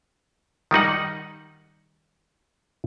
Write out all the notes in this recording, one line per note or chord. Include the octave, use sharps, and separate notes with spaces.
D#3 G3 D#4 F#5